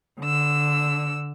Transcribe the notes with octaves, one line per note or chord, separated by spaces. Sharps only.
D3 E6